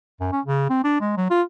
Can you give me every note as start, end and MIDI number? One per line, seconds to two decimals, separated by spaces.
0.20 0.29 42
0.32 0.40 61
0.46 0.65 49
0.70 0.82 60
0.84 1.00 62
1.01 1.16 56
1.17 1.30 54
1.30 1.42 65